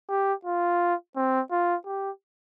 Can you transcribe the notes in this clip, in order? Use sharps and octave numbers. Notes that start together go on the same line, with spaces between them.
G4
F4
C4
F4
G4